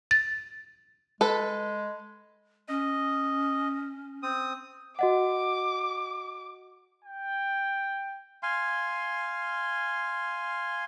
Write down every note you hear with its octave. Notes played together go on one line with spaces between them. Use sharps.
A6
G#3 A4 B4
C#4 D#5
C4 D#6
F#4 D#5 F#5 D6
G5
F5 G#5 C6